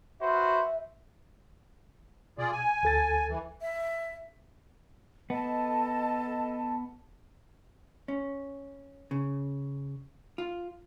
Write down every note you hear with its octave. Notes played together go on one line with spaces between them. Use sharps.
F#4 B4 C5 E5
B2 F4 G#4 D5
G#5
D2 A4 A6
E3
E5
B3 A4 D#5 A5
C#4
C#3
F4